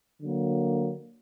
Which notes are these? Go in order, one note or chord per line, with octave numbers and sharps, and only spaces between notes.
D3 F#3 A#3